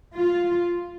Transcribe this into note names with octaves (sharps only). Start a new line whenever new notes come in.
F4